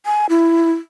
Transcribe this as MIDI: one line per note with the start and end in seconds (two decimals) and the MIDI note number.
0.06 0.26 80
0.30 0.72 64